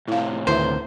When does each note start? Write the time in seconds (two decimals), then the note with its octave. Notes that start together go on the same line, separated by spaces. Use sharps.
0.08 A2 C3 E4 F5
0.47 D2 D3 D#3 E4 B4 C5 E5